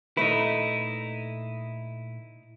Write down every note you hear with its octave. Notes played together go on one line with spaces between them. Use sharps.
A#2 A3 D#4 E4 B4